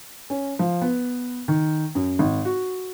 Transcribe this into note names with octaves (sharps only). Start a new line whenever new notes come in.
C#4
F3
B3
D#3
F#2
G#1
F#4